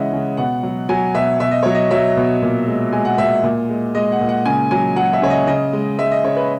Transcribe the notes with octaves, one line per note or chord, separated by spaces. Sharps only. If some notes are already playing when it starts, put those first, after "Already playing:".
Already playing: C#3 E3 G#3 C#5 D#5 E5 F#5
C#3
B2 F#5
F#3
F#3 G#5
B2 E5
B2 E5
D#5
F#3 C#5
D#5
F#3 E5
B2
A#2
G#3
G#3 G#5
F#5
A#2 E5
A#2
G#3
G#3 D#5
F#5
A#2
F#5
C#3 G#5
F#3 G#5
F#3 F#5
E5
C#3 C#5
D#5
C#3 D#5
G#3
G#3 E5
D#5
C#3 C#5
B4